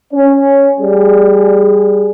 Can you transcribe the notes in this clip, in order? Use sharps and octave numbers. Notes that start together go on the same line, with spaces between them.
C#4
G3 G#4